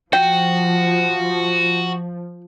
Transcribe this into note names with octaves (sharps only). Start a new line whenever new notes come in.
F3 F#4 G5